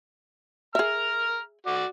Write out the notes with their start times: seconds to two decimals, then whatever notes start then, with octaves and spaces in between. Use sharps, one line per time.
0.75 G#4 E5 A#5 F6
1.66 F#4 D5